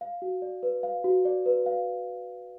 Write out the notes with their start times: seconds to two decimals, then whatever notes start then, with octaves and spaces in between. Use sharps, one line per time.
0.01 F5
0.22 F#4
0.42 D5
0.63 B4
0.83 F5
1.04 F#4
1.25 D5
1.46 B4
1.66 F5